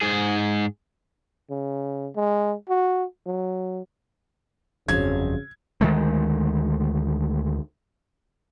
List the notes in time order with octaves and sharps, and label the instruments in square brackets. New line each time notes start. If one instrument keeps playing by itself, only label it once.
[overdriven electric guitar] G#2 G#4
[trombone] C#3
G#3
F#4
F#3
[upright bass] G1 F2 [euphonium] C#3 [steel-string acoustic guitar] F3 F#3 [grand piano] G#6
[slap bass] D2 D#3 G#3 A3